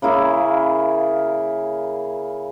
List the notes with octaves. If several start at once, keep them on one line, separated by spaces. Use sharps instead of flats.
C#3 A#3 E4 G#4